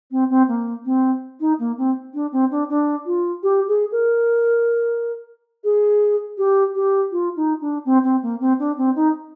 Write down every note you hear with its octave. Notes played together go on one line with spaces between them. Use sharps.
C4
C4
A#3
C4
D#4
A#3
C4
D4
C4
D4
D4
F4
G4
G#4
A#4
G#4
G4
G4
F4
D#4
D4
C4
C4
A#3
C4
D4
C4
D#4